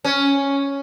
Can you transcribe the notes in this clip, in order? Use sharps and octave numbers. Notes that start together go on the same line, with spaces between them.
C#4